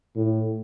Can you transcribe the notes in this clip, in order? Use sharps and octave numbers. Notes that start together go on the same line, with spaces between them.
A2